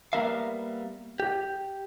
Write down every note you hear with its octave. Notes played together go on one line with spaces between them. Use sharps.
G3 A#3 B3 A#4 E5 F5
G4